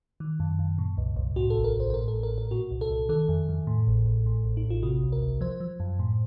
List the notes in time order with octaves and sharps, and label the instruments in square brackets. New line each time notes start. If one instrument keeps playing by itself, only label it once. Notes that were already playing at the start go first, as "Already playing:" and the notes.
[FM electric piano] D#3
F#2
F#2
A#2
C2
C2
A2 F#4
A1 A4
A#4
A1
C5
C5
A2 A#4
A4
A1
A#4
A1
A#4
A#2 F#4
C2
A4
C2
D#3 A4
F2
F2
A2
A1
A1
A2
A1
D#4
A1
F4
C3 F#4
C#2
A#4
C#2
F3 C5
F3
F#2
A2